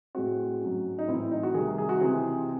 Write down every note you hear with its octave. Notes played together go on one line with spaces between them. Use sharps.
A2 G#3 C4 F#4
G#2 F#3 C#4
D#4
A2 E3 C4 E4
E4
D#4
F#4
C2 C3 D#3 G#4
G#4
F#4
C3 E3 G#3 C4 G#4